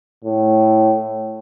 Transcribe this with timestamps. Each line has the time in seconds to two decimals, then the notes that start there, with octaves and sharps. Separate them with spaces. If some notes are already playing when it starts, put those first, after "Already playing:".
0.25 A2